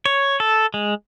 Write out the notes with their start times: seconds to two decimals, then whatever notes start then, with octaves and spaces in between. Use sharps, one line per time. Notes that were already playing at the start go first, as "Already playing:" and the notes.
0.06 C#5
0.40 A4
0.74 G#3